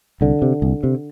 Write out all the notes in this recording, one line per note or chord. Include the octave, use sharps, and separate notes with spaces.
C2 D3
C3
C2
C3